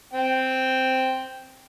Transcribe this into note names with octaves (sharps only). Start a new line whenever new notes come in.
C4 G5